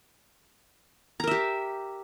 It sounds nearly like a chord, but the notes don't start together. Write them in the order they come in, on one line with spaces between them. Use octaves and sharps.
A#5 A#4 E5 G4